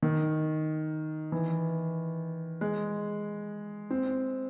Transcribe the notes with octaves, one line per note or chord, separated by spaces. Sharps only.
D#3
E3
G#3
C4